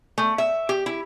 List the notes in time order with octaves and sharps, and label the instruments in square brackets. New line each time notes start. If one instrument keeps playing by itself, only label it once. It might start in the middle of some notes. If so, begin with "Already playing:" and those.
[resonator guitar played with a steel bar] A3
E5
G4
E4